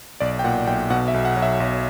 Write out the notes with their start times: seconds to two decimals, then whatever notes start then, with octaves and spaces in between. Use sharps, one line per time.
0.20 B1 D5
0.39 G5
0.44 A#2 F#5
0.67 B1 G5
0.90 B2 F#5
1.08 E5
1.14 B1
1.25 F#5
1.37 F#3
1.42 E5
1.60 B1